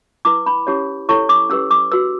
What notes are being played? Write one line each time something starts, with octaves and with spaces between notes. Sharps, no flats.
E4 B4 D6
B5
C#4 E4 G4 C#5
E4 A4 C#5 C#6
D6
C#4 G4 B4 E6
D6
F#4 B4 E6